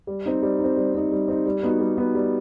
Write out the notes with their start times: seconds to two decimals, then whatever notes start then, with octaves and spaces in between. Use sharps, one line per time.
0.07 G3
0.26 C4 D#4
0.42 G3
0.59 D#4
0.64 C4
0.77 G3
0.94 C4 D#4
1.12 G3
1.28 C4 D#4
1.46 G3
1.63 B3 D#4 F#4
1.80 G3
1.98 B3 D#4 F#4
2.15 G3